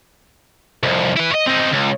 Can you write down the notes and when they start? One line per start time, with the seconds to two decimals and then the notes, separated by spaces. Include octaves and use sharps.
0.83 C2 F2
1.16 E4 B4
1.31 C#5 D#5
1.46 C4 D#4
1.72 C#2